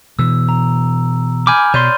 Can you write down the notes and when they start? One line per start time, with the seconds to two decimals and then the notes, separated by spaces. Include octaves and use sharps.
0.19 B2 E3 E6
0.49 A#5
1.47 G#5 B5 D6 F6 G6
1.74 B2 C#5 D5 C6 G6 D#7